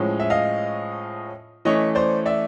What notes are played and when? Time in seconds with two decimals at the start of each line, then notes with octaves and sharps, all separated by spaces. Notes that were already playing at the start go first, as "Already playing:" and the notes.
Already playing: A2 F3 G#3 C#4
0.20 E5
0.30 D#5 F5
1.65 E3 A3 C#4 C#5 D#5
1.95 C5 D5
2.26 D5 E5